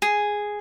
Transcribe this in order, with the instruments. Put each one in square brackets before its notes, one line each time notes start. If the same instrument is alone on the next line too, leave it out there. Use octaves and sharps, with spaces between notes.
[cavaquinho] G#4